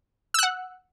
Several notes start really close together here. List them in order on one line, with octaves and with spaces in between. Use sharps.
E6 F#6 F#5